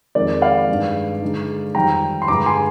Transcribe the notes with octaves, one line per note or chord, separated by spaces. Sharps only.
F2 D#3 G#3 A#4 D5
D5 F5
G2 D#3 G#3
D3 G#3 D#4
F2 D#3 G3 C4 G5 A#5
C6
G2 D3 G#3 A#5 D6
G#5 C6